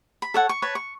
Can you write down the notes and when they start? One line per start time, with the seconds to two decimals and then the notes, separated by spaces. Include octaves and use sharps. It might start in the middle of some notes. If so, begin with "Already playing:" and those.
0.22 B5
0.34 A4 C#5 F#5
0.49 C#6
0.62 B4 C#5 A5
0.75 C#6